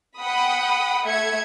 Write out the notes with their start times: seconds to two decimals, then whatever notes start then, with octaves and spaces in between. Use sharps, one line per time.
0.19 F#5 G5 B5 D#6
1.05 A3 E5 G#6 C#7